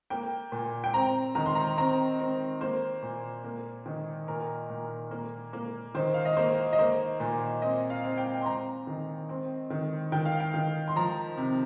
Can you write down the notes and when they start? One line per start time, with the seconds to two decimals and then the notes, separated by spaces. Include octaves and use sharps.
0.10 A#3 G5
0.52 A#2
0.84 G5
0.94 C4 A#5
1.35 D#3 A#5
1.46 C6
1.55 A#5
1.78 C4 A#5
2.19 C4
2.61 A#3 C5
3.02 A#2
3.44 A#3
3.86 D#3
4.28 A#2 A#4
4.70 A#2
5.11 A#3
5.53 A#3
5.95 D#3 C5
6.14 F5
6.25 D#5
6.37 A#3 C5
6.73 D#5
6.79 A#3 C5
7.20 A#2
7.62 C4 D#5
7.90 F5
8.04 C4
8.18 G5
8.42 C6
8.46 C4 A#5
8.87 D#3
9.29 C4
9.70 D#3
10.12 D#3 G5
10.26 F5
10.40 G5
10.54 D#3
10.88 C6
10.96 F3 A#5
11.37 C3